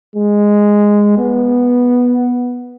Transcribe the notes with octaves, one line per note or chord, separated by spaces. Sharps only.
G#3
B3